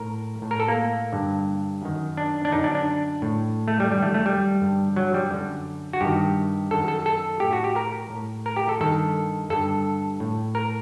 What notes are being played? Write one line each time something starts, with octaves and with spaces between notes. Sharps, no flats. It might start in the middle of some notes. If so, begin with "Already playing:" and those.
Already playing: A2 A#4
A2
A#4
A4
A#3
G2 D3
F#2 D#3
D4
D4
F#2 D3 D#4
D4
D4
A2
A3
G3
F#2 D#3 G3
A3
A3
G3
G2 D3
F#3
G3
F#2 D3
F#4
G2 D#3 G4
F#2 D#3 A4
A4
A4
A2 G4
F#4
G4
A#4
A2
A#4
G4
A4
G2 D#3 A4
G2 D3 A4
A2
A#4